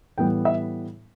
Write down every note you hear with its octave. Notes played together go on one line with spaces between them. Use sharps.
A2 E3 G3 B3 G5
E5